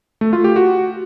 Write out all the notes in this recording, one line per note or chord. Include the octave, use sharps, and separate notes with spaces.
A3
F4
G4
F#4